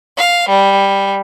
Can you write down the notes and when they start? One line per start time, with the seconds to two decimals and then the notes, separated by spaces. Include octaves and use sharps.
0.17 F5
0.49 G3